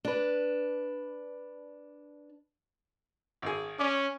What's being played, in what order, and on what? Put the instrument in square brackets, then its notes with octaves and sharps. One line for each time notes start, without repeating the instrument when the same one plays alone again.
[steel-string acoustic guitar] D4 B4
[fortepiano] G#1 G#4
[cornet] C#4 [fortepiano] D5